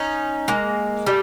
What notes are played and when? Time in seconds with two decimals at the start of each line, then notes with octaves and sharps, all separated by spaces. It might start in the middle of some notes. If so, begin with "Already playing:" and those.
Already playing: C#4 D#4
0.48 G#3 A#3
1.07 G3 A3